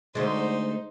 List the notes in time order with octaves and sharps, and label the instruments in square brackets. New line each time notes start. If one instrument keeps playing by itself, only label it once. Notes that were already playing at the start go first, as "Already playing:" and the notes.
[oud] D2 G#3 [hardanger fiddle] D#4 C5